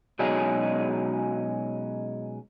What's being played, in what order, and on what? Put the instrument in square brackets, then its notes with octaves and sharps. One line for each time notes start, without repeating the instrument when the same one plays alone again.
[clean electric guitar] B2 F#3 G#3 C#4 D#4 G#4